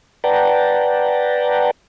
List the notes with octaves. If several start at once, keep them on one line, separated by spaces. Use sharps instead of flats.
B4 D5 F#5 G5 A5 A#5